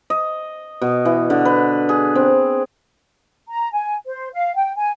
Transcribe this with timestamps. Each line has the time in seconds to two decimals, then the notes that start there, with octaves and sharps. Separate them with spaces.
0.10 D#5
0.82 B2
1.05 E3
1.30 D3
1.45 B4
1.89 G#4
2.15 C4
3.48 A#5
3.73 G#5
4.06 C5
4.33 F5
4.56 G5
4.76 G#5